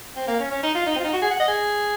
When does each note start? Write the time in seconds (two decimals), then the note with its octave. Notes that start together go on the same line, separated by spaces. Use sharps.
0.16 C4
0.28 A#3
0.40 C#4
0.51 C#4
0.63 D#4
0.75 F4
0.87 D#4
0.96 C4
1.00 F4
1.04 D#4
1.13 F#4
1.22 G#4
1.31 F#5
1.40 D#5
1.48 G#4